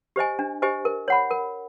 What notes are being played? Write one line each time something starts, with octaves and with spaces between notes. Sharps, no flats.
G4 C5 D#5 G#5
D4
G4 C5 D#5 G#5
A#4
C#5 F#5 B5
A#4